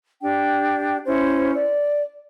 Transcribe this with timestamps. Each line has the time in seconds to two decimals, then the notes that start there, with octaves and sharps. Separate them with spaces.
0.22 D4 G4 G5
1.06 C#4 E4 C5
1.54 D5